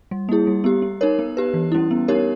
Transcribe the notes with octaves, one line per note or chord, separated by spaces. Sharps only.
G3
A#3 E4 G#4
G3
B3 G4
B3
D#4 A#4 C#5
B3
G4 B4
E3
G3 C#4 E4
B3
D#4 G4 A#4 C#5